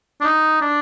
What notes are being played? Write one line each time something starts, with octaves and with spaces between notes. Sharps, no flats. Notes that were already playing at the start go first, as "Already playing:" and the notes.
D4
D#4
D4